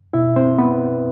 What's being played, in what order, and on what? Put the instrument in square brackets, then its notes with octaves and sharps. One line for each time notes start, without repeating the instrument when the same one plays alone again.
[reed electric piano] B2 E4 E5
C4 C5
B3 B4